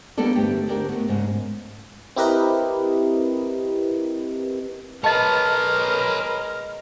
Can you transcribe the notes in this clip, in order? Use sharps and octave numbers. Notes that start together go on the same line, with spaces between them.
G3 A#3 B3 D4 A4 D5
D2 G2 A3 D4 G4
D2 D4 G4 A#4 D5
A3 B3
G#2 C#3 G#3
C4 E4 G4 A#4 B4 D#5
G#3 A#4 B4 C#5 D#5 A5